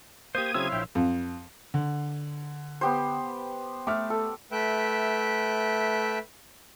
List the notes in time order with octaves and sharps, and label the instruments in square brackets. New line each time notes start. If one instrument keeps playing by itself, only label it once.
[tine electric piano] A#3 [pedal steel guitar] G4 C5 [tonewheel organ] D#6 G#6
[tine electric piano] C#3 F#3 C4 [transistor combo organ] E4 C5 F5 [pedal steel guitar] C#5 E6
[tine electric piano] A#1 [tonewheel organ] E5 G5
[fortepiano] F2
[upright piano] D3
[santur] B3 G4 C5
[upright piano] A3 E5 F6 [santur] D6
[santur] A4
[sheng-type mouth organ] A3 B4 E5 G5